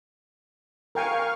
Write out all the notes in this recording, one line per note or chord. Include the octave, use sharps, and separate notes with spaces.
A#4 F5 G5 G#5 C#6